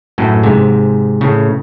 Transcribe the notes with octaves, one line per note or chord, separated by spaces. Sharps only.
F#2 A2
G#2 C3
A2 C#3